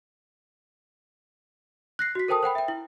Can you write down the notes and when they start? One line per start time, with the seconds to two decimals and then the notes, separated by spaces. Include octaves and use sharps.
1.99 F#6 A#6 C7
2.15 F#4 B6
2.28 A4 A#4 C5 G5 A5 D#6
2.43 C5 F#5 G5 B5
2.55 E5 G5
2.68 E4